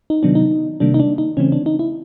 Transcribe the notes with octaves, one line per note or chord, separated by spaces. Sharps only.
D#4
C3 D#3 F#3 B3 D4
D#4
C3 D#3 G3 A#3 D4
D#4
D4
D#4
C#3 E3 A3 C4 C#4
D4
D#4
E4